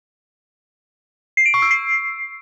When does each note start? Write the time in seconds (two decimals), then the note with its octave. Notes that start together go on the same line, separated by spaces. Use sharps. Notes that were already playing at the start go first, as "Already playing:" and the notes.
1.37 C7
1.46 D7
1.54 C#6
1.62 E6
1.71 C7